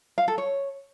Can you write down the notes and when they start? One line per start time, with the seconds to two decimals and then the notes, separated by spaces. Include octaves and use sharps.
0.18 F5
0.28 A4
0.38 C#5